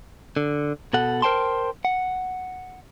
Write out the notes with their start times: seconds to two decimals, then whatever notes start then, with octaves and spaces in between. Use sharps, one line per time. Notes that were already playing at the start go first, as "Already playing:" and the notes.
0.37 D3
0.93 B2 A4 F#5
1.22 A#4 C5 G5 A5 C6
1.85 F#5